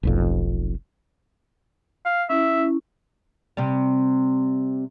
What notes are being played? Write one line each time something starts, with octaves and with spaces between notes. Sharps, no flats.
F1 B1 F2
F5
C#4 E4 E5
C3 G3